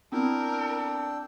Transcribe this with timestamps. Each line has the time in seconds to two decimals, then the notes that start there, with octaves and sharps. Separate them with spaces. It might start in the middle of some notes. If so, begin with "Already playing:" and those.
0.12 B3 C4 D4 E4 A#4 G5 E6